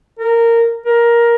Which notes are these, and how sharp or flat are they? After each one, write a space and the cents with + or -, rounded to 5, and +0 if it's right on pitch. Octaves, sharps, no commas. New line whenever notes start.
A#4 -10
A#4 +15